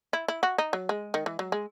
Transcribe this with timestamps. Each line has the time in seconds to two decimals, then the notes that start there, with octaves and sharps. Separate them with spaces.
0.13 E4
0.28 E4
0.43 F#4
0.58 D#4
0.73 F#3
0.89 G#3
1.14 D#3
1.26 E3
1.39 F#3
1.52 G#3